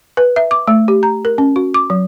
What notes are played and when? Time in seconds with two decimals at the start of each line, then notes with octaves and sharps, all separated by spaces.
0.17 B4
0.36 E5
0.51 D6
0.68 A3
0.88 G4
1.03 A#5
1.25 A#4
1.38 C#4
1.56 F#4
1.74 D6
1.90 F#3